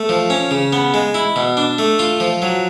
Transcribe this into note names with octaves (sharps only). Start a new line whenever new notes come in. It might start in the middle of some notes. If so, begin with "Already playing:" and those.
Already playing: A3
F3
C#4
C#3
B3
G#3
E4
B2
D4
A3
F4
F3
F#3